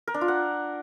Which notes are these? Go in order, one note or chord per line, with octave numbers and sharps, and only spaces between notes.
A#4
D4
F4
F#5